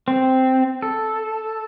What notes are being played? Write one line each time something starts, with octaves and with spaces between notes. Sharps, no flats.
C4
A4